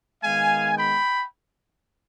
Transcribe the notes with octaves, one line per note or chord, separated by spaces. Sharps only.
D#3 G#3 B3 F5 G#5
G5 B5